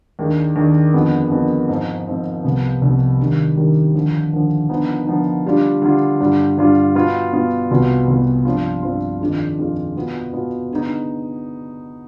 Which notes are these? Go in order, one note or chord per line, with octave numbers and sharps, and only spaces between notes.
D#2 D#3 G#3 D4
D#2 D#3 G#3 D4
F2 D3 G#3 B3
F2 D3 G#3 B3
G#2 F3 C4 D#4
G#2 F3 C4 D#4
C2 C3 F3 B3
C2 C3 F3 B3
D#2 D#3 G3 D4
D#2 D#3 G3 D4
D#2 D3 F3
D#2 D3 F3
D3 F3 B3 D#4
D3 F3 B3 D#4
D3 G3 D4 F4
D3 G3 D4 F4
G2 D3 G3 D4 F4
G2 D3 G3 D4 F4
B2 B3 F4
B2 B3 F4
C2 B2 B3 F4
C2 B2 B3 F4
G2 F3 C4 F4
G2 F3 C4 F4
F2 D#3 G#3 D4 F4
F2 D#3 G#3 D4 F4
B2 B3 F4
B2 B3 F4
D3 G#3 B3 D#4